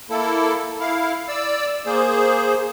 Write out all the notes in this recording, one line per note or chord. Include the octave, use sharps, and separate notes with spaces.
A#3 E4 A4
E4 F5
D5 E6
A#3 G#4 C5